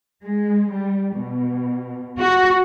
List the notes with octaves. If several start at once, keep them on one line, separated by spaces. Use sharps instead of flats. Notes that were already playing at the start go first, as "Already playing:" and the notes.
G#3
G3
B2
F#4